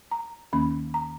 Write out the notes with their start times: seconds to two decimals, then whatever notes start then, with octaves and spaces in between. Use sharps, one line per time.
0.11 A#5
0.53 D#2 D#3 A#3 C#4 B5
0.94 A#5